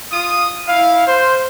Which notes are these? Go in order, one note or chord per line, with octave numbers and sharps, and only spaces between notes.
F4 D#6
E4 F5
C5